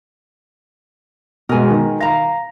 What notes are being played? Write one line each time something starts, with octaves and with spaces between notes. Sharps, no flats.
B2 G#3 A#4 G#5
D#3
F5 A#5 A#6